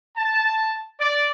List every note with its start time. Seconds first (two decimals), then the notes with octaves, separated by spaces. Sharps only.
0.18 A5
1.00 D5